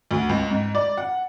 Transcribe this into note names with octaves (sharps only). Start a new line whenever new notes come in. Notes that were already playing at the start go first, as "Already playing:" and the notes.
D2
C#2
G#2
D5
F#5